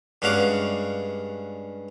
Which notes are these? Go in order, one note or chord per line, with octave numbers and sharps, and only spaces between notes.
G2 G#3 C#4 F#4 F5 D6